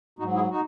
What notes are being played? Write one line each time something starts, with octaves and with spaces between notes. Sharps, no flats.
G#2 F#3 D#4 F#4
E4 G#4
D#4 F#4